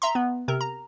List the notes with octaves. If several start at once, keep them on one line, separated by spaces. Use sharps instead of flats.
E5 A#5 C6
B3
C3 A#4
A#5